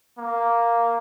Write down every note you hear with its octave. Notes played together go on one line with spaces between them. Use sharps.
A#3